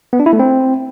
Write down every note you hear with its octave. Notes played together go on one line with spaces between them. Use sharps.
B3
D4
E4
A3
C4